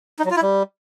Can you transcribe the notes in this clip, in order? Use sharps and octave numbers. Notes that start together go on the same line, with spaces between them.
D#4
F#3
F4
E4
G3